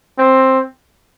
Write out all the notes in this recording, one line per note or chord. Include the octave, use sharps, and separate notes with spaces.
C4